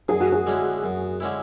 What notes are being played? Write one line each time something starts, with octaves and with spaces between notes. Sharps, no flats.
F#2 G#4
F#4
G#4
D3 G#3 C#4 E4
F#2
D3 G#3 C#4 E4